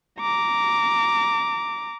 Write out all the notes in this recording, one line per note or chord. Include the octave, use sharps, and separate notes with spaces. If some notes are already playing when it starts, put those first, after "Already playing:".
A#5 D6